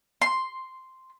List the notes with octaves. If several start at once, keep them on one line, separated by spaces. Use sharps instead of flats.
C6